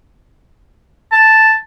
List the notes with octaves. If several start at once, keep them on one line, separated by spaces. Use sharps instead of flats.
A5